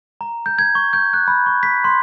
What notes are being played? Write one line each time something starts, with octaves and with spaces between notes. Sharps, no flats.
A#5
G6
G#6
C#6
G6
F#6
B5
C#6
B6
C6